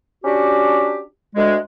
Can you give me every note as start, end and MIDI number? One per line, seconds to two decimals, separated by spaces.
0.24 1.02 61
0.24 1.02 62
0.24 1.02 66
0.24 1.02 67
1.35 1.56 38
1.35 1.56 56